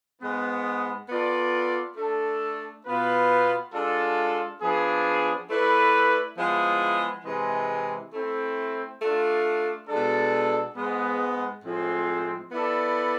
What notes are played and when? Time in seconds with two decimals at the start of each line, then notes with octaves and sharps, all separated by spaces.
0.21 G#2 G#3 B3
1.09 B3 F4 A4 D5
1.97 A3 D4 A4
2.85 B2 B3 F4 B4
3.73 G#3 D4 F4 A4
4.61 F3 B3 D4 G#4
5.49 A3 E4 B4 D5
6.37 F3 G#3 B3 E4 G#4
7.25 C3 E3 G#3
8.12 A3 C4 E4
9.00 A3 D4 F4
9.89 B2 G#3 D4 A4
10.76 G#2 G#3 B3
11.63 A2 F3 G#3 C4
12.52 B3 E4 A4 D5